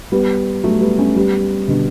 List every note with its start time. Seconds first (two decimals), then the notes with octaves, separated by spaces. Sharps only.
0.12 G3 B3
0.64 F#3 A3
0.81 G3 B3
0.98 A3 C#4
1.15 G3 B3
1.68 B2 D3